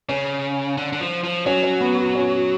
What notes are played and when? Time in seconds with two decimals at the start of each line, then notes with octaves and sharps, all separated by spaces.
0.09 C#3 C#4
0.77 D3
0.93 D3
1.00 F3
1.24 F3
1.46 F#3 C#4
1.63 C#4
1.81 B3
1.98 B3
2.15 C#4